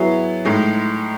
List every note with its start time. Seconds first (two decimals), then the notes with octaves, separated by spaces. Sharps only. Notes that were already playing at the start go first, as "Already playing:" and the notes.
Already playing: F#3 B3 E4 G#4
0.45 A2 G#3 D#4